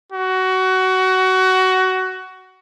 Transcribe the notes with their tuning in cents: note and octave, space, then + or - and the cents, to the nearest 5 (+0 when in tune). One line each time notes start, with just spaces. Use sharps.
F#4 +20